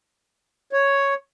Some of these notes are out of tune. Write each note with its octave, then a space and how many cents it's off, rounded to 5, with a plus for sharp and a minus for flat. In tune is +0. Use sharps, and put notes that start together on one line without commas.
C#5 +0